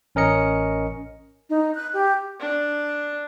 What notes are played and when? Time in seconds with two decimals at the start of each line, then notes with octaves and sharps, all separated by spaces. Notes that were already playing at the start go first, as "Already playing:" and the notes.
0.15 A1 C#4 A#4 D#5 C#7
1.50 D#4
1.75 F#6
1.93 G4
2.40 D4